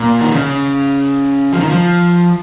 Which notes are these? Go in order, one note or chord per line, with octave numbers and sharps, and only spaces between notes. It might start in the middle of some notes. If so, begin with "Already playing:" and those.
Already playing: A#2
D#3
C#3
F3
D#3
F3